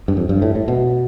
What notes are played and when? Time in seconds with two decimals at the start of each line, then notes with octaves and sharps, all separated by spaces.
0.08 G2
0.17 F2
0.29 G2
0.42 A2
0.55 A2
0.68 B2